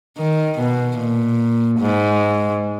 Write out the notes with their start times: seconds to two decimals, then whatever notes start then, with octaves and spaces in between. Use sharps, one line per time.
0.17 D#3
0.58 B2
0.98 A#2
1.79 G#2